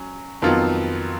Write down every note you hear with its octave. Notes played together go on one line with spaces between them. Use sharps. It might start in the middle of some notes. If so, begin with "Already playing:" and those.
Already playing: F#3 C#4
F2 D#3 F#3 B3 F4